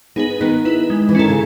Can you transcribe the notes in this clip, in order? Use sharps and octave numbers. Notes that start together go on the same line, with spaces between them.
B3 D#4 G#4 B4
D#3 B3
E4 B4
G#3
E3
D#3 C#4 E4 A4
C#3